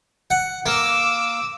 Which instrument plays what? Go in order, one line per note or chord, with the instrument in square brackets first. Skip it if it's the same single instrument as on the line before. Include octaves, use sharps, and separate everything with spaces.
[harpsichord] F#5
[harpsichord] A#3 [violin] D6 E6